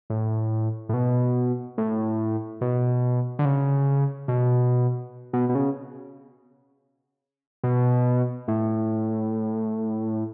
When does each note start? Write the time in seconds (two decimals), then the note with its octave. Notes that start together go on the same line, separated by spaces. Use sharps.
0.10 A2
0.89 A2
0.94 B2
1.78 A2
2.61 B2
3.39 D3
3.45 C#3
4.28 B2
5.33 B2
5.49 B2
5.55 C#3
7.64 B2
8.48 A2